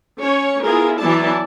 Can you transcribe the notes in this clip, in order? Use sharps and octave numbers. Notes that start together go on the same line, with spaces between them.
C#4 C#5
B3 E4 F4 G#4 A#4
E3 F#3 B3 E4 D5 A5